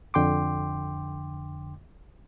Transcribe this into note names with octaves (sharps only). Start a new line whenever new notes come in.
F2 D3 G5 C6 D6